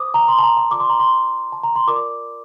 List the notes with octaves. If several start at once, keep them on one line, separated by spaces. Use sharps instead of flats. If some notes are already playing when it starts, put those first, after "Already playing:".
Already playing: C5 D6 D#6
A#5
C6
A5
A#5
A5
F4 A4 D5 D6
C6
A#5
C6
A5
A#5
C6
F4 A#4 D5 D6